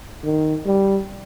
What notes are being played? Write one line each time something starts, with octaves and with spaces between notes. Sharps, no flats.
D#3
G3